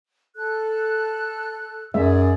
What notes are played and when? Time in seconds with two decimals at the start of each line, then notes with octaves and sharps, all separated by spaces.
0.37 A4 F#6
1.94 F#2 G#3 G#4 D5 E5